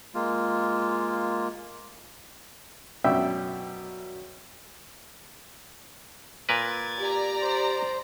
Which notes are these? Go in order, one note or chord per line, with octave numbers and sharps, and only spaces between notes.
G#3 A#3 F4
F#2 B2 D5 E5 G5
A#2 A#4 B4 G#6 A6
G4 D5 A#5
C5